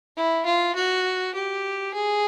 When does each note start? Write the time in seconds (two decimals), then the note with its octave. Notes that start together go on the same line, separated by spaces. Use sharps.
0.17 E4
0.46 F4
0.76 F#4
1.35 G4
1.94 G#4